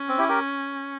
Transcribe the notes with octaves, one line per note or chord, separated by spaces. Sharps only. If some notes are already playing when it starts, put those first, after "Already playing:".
Already playing: C#4
C4
E4 G4
G4 A#4